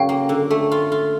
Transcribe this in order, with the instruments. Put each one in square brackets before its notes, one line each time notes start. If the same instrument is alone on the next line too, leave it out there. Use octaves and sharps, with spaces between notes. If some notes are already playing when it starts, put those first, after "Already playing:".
Already playing: [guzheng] F#2 C#3 [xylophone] F5 G5
[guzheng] A#3
D3
A3
F4
F4